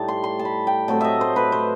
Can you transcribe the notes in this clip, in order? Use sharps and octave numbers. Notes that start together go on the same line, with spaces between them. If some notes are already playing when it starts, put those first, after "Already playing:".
Already playing: A2 G3 D#4 A5
C6
C6
A5
B5
G5
A2 F#3 A3 C4 A5
D#5 E5
C5
B4
C5